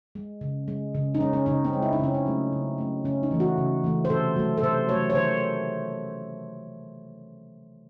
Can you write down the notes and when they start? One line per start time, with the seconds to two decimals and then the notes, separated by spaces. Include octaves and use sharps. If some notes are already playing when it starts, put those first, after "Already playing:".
0.15 G#3
0.41 C#3
0.68 G#3
0.95 C#3
1.15 D#4
1.20 G#3 C#4
1.33 C#4
1.46 C#3 D#4
1.65 C4
1.73 G#3
1.82 E4
1.93 D#4
1.99 C#3 C#4
2.14 D#4
2.26 F#3 A3
2.52 C#3
2.78 F#3 A3
3.04 C#3 C#4
3.23 D#4
3.31 E3 A3
3.40 F#4
3.58 C#3
3.84 E3 A3
4.05 C5
4.10 C3 A4
4.36 F#3 A3
4.57 A4
4.63 C3 C5
4.89 F#3 A3 C#5
5.10 C#5
5.15 D#3 C5